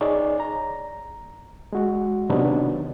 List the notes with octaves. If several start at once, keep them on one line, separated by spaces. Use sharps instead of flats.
D#4 G#4 C#5 D5
A#5
G#3 F#4
C3 D#3 F#3 B3 D4 D#4